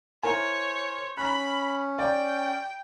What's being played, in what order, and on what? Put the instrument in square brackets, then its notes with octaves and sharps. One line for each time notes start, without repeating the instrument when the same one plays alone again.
[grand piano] E4 A#4 G#5 [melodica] C5 [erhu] C#5
[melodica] C#4 [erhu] B5 [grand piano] F#6
[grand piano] D5 [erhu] G5